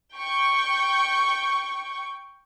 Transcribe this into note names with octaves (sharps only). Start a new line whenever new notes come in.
G5 C#6